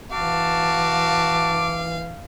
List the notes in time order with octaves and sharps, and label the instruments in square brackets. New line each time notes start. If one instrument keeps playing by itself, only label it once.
[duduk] E3 [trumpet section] F#4 A5 [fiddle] F5 [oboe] D6